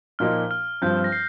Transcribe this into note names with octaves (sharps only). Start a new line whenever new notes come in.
A#2 F3 A#3 D#4 F6
F6
G2 F3 C4 G6
A#6
C7